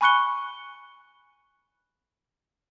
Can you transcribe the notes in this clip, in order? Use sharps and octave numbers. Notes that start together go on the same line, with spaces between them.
G#5 B5 C#6 F#6 C#7 G7